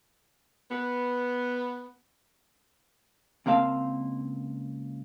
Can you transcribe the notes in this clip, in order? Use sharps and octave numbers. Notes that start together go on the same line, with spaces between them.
B3
C#2 A#3 C4 F5 A5